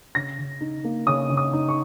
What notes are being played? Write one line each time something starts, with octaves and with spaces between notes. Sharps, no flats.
C#3 A#6
C#3
D#4
A#3
C#3 D#6
C#3
D#6
D#4
C#6